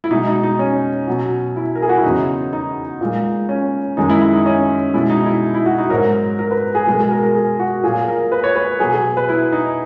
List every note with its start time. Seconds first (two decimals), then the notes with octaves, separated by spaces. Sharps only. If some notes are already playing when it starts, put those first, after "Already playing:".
0.04 E4
0.11 B2 G#3 D#4
0.27 D#4
0.43 D#4
0.59 C#4
1.07 B2 F#3
1.56 E4
1.75 A#4
1.82 G#4
1.89 F#4
1.97 E4
2.04 E2 C#3 F#3 D#4
2.53 D#4
3.01 A#2 G#3
3.49 C#4
3.97 F#2 D#3 G#3 D#4
4.10 E4
4.21 E4
4.33 D#4
4.46 C#4
4.94 B2 G#3 E4
5.10 D#4
5.26 E4
5.54 E4
5.66 F#4
5.78 D#4
5.90 G#2 F#3 A#4
6.39 A#4
6.51 B4
6.75 G#4
6.87 B2 G#3 A#4
6.99 G#4
7.11 A#4
7.23 A#4
7.35 G#4
7.60 F#4
7.83 A#2 F#3 G#4
8.08 A#4
8.32 B4
8.44 C#5
8.56 B4
8.80 B2 F#3 G#4
8.93 G#4
9.17 B4
9.29 E4
9.52 D#4